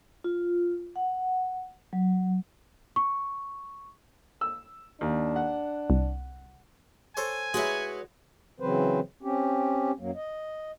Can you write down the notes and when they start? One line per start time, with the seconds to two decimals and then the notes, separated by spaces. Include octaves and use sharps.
0.24 F4
0.96 F#5
1.93 F#3
2.96 C#6
4.41 E6
5.01 D#2 D4
5.36 F#5
5.90 C2
7.17 A4 C5 C#5 G#5
7.54 G#3 E4 F#4 B4 C#5
8.60 C#3 E3 F#3 C4 B4 C5
9.23 C4 C#4 G4
9.99 F#2 F#3 A#3
10.15 D#5